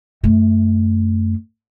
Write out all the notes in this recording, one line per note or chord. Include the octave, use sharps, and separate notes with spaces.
F#2 A3